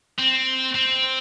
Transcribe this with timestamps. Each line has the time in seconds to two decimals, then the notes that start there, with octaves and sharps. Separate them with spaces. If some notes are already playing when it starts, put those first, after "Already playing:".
0.18 C4
0.75 C4